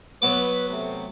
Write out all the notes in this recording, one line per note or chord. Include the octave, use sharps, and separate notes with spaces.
F#3 B3 B4 D6
C3 A3